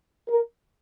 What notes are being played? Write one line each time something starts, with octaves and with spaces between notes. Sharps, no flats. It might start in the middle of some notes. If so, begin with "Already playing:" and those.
A#4